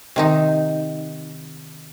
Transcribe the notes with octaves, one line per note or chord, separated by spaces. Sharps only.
C3 D#3 D#4